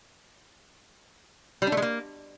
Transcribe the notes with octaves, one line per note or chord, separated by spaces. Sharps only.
G3
D4
A3
G#3
A#3